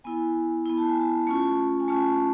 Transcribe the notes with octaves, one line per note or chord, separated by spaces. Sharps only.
B3 E4 G#5
B3 E4
A5
G#5
A5
A3 C#4 F4
G#5
A3 C#4 F4 A5